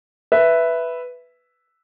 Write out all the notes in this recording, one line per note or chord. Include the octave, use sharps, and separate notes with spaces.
B4 E5